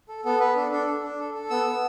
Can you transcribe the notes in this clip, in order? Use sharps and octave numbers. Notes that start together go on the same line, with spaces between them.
A4
B3 A4
B3 B4
D4 A4
D4 A4
A4
D4
A4
A4
B3 E6
B3